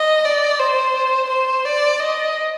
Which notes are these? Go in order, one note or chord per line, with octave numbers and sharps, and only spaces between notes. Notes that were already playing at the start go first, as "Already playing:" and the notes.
Already playing: D#5
D5
C5
C5
D5
D#5